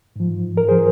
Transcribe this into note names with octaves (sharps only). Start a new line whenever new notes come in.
G#2 F3
A#4
F3 G#4 C5